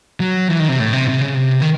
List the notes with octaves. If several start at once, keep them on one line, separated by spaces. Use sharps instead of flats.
F#3
E3
D#3
C3
A2
C3
C3
C#3
C3
D#3